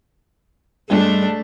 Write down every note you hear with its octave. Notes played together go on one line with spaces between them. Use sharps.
G2 G#3 A3 D4